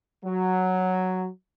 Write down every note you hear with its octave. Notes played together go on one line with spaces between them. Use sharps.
F#3